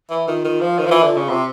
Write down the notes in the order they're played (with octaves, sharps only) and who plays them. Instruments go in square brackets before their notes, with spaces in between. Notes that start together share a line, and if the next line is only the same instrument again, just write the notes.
[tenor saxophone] E3
[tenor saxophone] D#3 [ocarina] F4
[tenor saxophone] D#3
F3
D#3
F3
E3
D3
C#3
C3